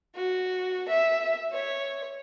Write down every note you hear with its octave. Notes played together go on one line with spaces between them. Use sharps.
F#4
E5
C#5